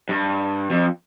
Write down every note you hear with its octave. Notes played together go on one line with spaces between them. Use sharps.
G2
F2